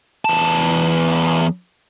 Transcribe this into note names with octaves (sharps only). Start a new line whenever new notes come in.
E2 A5